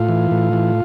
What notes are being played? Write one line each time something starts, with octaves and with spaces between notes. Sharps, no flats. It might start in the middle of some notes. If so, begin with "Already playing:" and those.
Already playing: A2 F4
E3
A2
E3